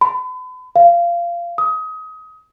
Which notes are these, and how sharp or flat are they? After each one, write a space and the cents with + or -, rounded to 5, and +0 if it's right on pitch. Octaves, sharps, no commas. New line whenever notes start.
B5 +40
F5 -20
D#6 +25